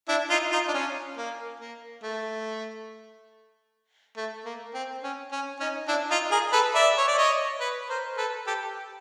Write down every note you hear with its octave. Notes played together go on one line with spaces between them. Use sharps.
D4 E4
D#4 F4
D#4 F4
D4
C#4
A#3
A#3
A3
A3
A#3
C4
C#4
C#4
C#4 D#4
D4 E4
D#4 F4
G#4 A#4
A4 B4
D5 E5
C#5
D5
C#5 D#5
B4 C#5
A#4 C5
A4 B4
G4 A4